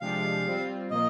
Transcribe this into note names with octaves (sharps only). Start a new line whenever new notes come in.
C3 F3 G#3 D4 G4 F5
G3 C4 F4
A#2 F3 A#3 F4 A#4 D#5